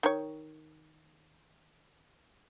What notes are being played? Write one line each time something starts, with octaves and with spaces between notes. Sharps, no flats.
D#3 C#5